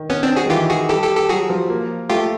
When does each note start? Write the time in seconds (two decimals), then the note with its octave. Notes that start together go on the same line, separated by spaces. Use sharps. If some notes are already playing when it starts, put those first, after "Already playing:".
Already playing: D#3
0.10 B3 C#4
0.23 C4 D4
0.36 F#4 G#4
0.46 D#3
0.50 E3 F4 G4
0.70 F#4 G#4
0.89 G3 G4 A4
1.03 G4 A4
1.16 G4 A4
1.29 F#3 F#4 G#4
1.50 F3
1.69 A#3
2.10 A3 F4 G4